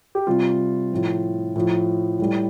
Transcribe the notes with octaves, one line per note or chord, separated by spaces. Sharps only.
G4
C3 G3 F4
A2 F3
A2 F3
A2 G3